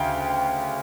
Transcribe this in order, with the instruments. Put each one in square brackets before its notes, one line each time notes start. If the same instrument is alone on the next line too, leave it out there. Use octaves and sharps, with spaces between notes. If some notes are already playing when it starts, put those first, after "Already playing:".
Already playing: [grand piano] D2 C#3 F5 G5